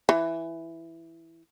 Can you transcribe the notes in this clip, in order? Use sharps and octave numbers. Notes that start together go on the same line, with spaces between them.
E3